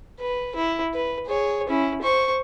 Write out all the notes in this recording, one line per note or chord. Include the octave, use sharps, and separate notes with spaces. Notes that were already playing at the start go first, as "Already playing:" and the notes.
B4
E4
B4
G#4 C#5
C#4 E4
C5 C#6